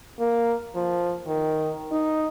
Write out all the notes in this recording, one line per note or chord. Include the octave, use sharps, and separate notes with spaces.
A#3
F3
D#3
D#4